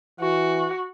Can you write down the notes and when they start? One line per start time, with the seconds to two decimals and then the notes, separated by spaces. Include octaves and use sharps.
0.20 E3 F#4